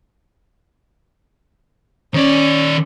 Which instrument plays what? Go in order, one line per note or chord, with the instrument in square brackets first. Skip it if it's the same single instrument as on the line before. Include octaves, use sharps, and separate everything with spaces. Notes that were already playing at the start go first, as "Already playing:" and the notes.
[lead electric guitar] D#3 D5 [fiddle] C#4